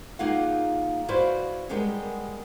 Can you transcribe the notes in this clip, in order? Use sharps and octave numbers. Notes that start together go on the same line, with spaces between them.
A#3 D#4 F4 G#4 F5 F#5
E4 F#4 B4 C5 D5 F5
G3 G#3 B3 G4 G#4 A#4